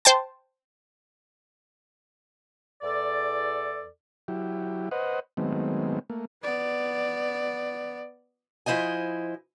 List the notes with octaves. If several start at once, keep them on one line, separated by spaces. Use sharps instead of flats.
C5 G5 A5
E2 A4 D5
F#3 E4 G4
B4 C5 D#5 F#5
D#3 F#3 G#3 A3 B3 C4
A3 A#3
B3 D5
F3 E4 C5 D#5 G#5